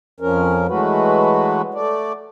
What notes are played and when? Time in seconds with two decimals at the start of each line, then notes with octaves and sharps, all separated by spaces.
0.20 F2 F3 C#4 A#4
0.68 E3 F#3 G#3 A3 F#4 B4
1.74 A3 D5